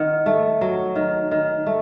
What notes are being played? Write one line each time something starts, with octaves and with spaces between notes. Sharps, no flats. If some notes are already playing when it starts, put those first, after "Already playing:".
Already playing: D#3 F#5
A3
F#3
D#3
D#3
A3